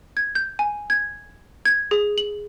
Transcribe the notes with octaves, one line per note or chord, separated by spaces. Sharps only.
G#6
G6
G#5
G#6
G#6
G#4
F#7